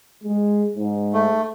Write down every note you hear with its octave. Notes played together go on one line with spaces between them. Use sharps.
G#3
G#2
A3